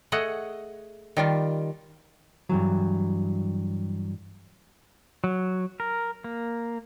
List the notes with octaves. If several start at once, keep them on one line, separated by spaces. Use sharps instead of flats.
A3 G#4 D#5 F#5
D#3 G3 F4
G2 E3 F#3
F#3
A#4
A#3